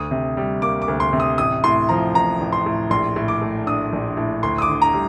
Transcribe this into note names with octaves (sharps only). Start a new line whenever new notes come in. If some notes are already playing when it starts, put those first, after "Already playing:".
Already playing: D2 D#6
C3
G3
A#3 D6
D6
D2
C6
C3
D#6
A1 D#6
A2 C6
F3 A#5
A1 A#5
A1
C6
A2
A#1 C6
A2
D6
A3
D4 D#6
A#1
A2
D2 C6
D#6
D6
D3
A#5
G3